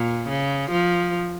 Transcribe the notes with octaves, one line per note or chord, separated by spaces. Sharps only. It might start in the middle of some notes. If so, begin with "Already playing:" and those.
Already playing: A#2
C#3
F3